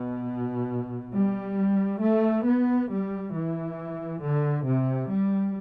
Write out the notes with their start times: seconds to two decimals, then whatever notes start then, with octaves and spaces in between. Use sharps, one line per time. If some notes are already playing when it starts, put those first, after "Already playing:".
Already playing: B2
1.13 G3
2.01 A3
2.46 B3
2.89 G3
3.33 E3
4.22 D3
4.66 C3
5.10 G3